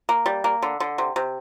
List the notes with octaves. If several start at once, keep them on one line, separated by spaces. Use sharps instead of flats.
A#3
G3
A#3
D3
D3
C3
C3